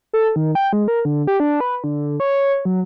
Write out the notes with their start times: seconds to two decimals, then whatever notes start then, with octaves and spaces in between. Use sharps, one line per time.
0.13 A4
0.36 D#3
0.55 G5
0.73 G#3
0.88 A#4
1.05 D3
1.27 G4
1.40 D4
1.60 B4
1.84 D3
2.20 C#5
2.65 F#3